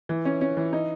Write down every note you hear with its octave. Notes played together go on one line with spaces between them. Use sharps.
E3
C#4
C#4
E3
D#4